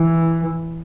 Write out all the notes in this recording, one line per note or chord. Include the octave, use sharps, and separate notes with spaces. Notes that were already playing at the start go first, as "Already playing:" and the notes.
Already playing: E3